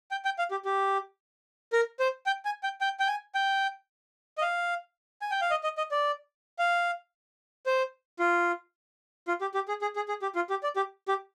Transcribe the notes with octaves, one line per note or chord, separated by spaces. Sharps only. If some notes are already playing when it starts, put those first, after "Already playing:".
G5
G5
F5
G4
G4
A#4
C5
G5
G#5
G5
G5
G5
G#5
G5
D#5
F5
G#5
G5
F5
D#5
D#5
D#5
D5
F5
C5
F4
F4
G4
G4
G#4
G#4
G#4
G#4
G4
F4
G4
D5
G4
G4